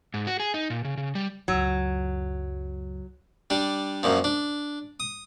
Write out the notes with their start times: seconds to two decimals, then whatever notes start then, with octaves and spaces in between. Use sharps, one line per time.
0.14 G#2
0.27 F#4
0.40 G#4
0.54 D#4
0.70 A#2
0.84 C#3
0.97 C#3
1.15 G3
1.48 C#2 F#2 F#3
3.50 G3 D4
4.03 F#2 A#2 F3
4.24 D4
5.00 D#6